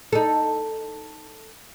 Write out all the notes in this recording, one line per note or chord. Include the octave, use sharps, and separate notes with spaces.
D#4 A4